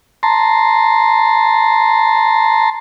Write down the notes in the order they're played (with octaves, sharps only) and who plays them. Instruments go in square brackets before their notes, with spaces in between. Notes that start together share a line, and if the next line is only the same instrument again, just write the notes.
[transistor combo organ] A5 A#5 C6